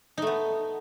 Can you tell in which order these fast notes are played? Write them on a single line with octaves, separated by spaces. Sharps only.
D#4 A3 B3